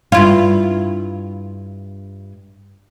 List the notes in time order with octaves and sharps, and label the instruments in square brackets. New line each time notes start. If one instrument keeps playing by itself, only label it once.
[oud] G2 E4 F4